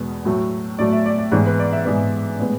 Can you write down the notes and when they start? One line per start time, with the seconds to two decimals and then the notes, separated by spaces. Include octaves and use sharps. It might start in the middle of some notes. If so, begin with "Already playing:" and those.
Already playing: E2 B2 G#3 B3
0.25 A2 F#3 A3
0.79 A2 F#3 A3 D5
0.92 E5
1.06 D5
1.18 D5
1.32 G#2 E3 G#3 B3 C#5
1.46 B4
1.59 D5
1.72 E5
1.85 G#2 E3 G#3 B3 D5
2.39 A2 G#3 B3